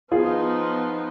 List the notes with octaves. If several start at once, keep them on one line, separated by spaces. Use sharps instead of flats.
F3 B3 D#4 F4 G#4